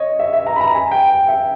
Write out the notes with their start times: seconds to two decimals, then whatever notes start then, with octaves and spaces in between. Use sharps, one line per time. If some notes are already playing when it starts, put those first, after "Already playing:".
Already playing: C#5 D#5
0.19 E5
0.33 E5
0.46 A#5
0.56 B5
0.61 A#5
0.74 G#5
0.92 G5
1.10 G5
1.28 E5